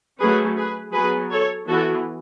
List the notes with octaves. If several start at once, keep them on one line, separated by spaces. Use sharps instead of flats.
F#3 A3 C#4 G#4 B4
G#4 B4
F#3 B3 G#4 B4
A4 C#5
E3 B3 F#4 A4